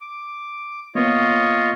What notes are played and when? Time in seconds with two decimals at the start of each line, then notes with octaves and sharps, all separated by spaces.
0.01 D6
0.95 A#3 B3 F4 C#5 D#5